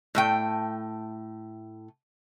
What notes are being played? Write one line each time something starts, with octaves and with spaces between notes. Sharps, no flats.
A2 A3 G5